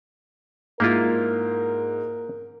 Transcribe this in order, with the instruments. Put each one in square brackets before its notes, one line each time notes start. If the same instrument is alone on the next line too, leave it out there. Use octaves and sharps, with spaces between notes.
[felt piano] G#2 G6 [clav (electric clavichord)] A#3 E4 F4 [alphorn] A#4